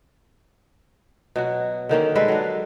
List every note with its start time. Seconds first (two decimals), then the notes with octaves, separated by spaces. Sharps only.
1.36 B2 F#3 F#4
1.89 D3 D#3 A#3 C#4
2.15 G3 G#3 A4 B4
2.28 F#3 D4